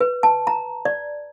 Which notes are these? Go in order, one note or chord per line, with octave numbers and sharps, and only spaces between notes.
B4
A5
A#5
D5